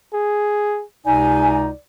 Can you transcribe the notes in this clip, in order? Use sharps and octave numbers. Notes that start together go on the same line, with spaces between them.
G#4
C#2 C3 D#4 D5 G#5